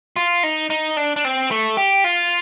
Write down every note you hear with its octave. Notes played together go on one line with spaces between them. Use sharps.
F4
D#4
D#4
D4
D4
C4
A3
G4
F4